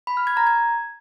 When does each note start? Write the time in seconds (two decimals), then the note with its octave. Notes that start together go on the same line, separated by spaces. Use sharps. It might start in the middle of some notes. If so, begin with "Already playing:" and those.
0.07 B5
0.17 F6
0.27 G#6
0.37 A#5
0.47 G#6